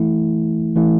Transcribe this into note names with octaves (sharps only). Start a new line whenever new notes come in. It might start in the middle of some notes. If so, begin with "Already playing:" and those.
Already playing: E3 A3 E4
E3 A3 E4